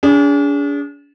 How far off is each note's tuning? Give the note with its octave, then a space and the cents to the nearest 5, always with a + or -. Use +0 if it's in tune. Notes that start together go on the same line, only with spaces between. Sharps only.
D4 -40 G#4 -15